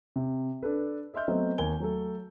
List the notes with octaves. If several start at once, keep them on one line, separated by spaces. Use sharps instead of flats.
C3
D4 A4 B4
D#5 E5 C6 F6 G6
F#3 A3 B3 C4 D#5
D#2 A#4 G#5 G7
F#3 A3 A4